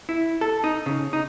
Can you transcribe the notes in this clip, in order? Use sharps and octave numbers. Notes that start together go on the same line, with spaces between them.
E4
A4
D#4
C#3
D#4